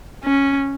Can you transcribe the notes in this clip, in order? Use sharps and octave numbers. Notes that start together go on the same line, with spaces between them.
C#4